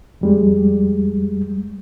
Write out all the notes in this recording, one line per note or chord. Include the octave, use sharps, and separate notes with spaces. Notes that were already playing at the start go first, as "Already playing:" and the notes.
F2 G3 G#3